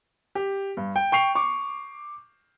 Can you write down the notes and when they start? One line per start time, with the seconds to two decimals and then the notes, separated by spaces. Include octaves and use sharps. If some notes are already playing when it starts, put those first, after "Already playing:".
0.35 G4
0.77 G2
0.96 G5
1.12 G5 C#6 C7 F7
1.35 C#6 D6